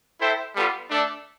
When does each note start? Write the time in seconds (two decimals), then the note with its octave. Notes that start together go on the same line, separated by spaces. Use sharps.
0.20 E4 A4 C5 E5 G5
0.55 G3 B3 F4 A4
0.90 A3 D4 A4 D5